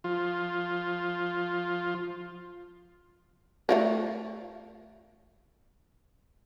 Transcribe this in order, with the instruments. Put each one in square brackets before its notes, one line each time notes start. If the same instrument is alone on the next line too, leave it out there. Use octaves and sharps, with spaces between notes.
[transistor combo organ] F3 F4
[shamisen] A3 F4 A#4